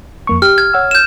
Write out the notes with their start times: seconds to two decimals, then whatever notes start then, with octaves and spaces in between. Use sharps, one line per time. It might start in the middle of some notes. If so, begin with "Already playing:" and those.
0.27 F2 A#3 C#6
0.42 G4 F6
0.58 G#6
0.73 C#5 F#5 E6
0.91 G6 E7